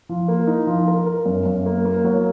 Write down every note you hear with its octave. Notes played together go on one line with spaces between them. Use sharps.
F3
A#3
D#4
F3
A#4
A#4
F#2
F#2
A#3
A#3
F#3